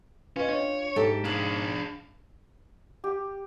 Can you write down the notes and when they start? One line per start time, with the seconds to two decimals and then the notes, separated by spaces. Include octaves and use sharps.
0.36 C#4 F4 B4 D#5
0.49 D4 C#5
0.96 G#2 G4 A4 E5
1.25 D4 G#4 F5 G#6 F#7
3.04 G4